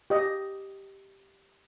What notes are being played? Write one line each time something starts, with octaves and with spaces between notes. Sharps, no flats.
G4 D#5